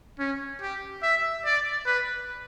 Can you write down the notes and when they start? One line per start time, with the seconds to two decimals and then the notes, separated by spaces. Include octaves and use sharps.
0.19 C#4
0.62 G4
1.03 E5
1.45 D5
1.86 B4